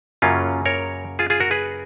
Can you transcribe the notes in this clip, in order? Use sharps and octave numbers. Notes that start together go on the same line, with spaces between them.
F#2 C#3 F#3 A#3 C#4 F4
A#4 C#5
F4 G#4
F4 G#4
F#4 A#4
G#4 B4